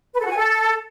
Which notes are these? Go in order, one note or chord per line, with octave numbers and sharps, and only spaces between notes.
B4
A4
F#4
G#5
A4